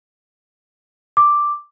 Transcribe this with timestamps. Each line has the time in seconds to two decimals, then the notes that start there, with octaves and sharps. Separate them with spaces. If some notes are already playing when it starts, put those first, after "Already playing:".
1.17 D6